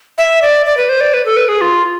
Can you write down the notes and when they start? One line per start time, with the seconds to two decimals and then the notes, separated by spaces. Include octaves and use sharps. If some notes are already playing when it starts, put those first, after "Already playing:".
0.18 E5
0.42 D5
0.66 D5
0.77 B4
0.89 C5
1.01 D5
1.14 B4
1.26 A4
1.37 B4
1.48 G#4
1.61 F4